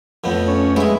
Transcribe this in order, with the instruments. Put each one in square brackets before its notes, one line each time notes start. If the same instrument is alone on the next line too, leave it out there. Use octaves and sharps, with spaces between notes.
[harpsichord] F2 A2 B3
[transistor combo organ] C#4
[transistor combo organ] G#3 [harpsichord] B3 [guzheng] E4 E5